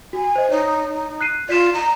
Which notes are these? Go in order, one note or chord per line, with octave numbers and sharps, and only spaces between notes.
F#4 G#5
C5 D#5
D#4 C#5
F#6 C7 D#7
F4 D5 B6 E7
A#5